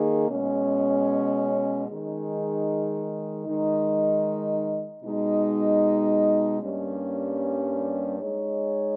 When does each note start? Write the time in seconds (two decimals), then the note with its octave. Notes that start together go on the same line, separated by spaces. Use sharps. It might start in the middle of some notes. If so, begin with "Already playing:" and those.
Already playing: D#3 A#3 D#4 G#4
0.29 B2 G#3 C#4
1.87 D#3 G#3 D#4 G#4
3.45 D#3 G#3 D#4
5.03 B2 G#3 D#4
6.61 G2 G3 A#3 C#4
8.18 G#3 D#4 G#4 C#5